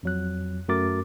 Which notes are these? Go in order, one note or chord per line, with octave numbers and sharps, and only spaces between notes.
F2 F#3 F#6
F#2 A3 F#4 A#4 D6 A6